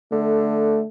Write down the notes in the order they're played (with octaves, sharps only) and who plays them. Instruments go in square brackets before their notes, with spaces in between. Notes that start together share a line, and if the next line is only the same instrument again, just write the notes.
[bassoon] D3 [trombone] A3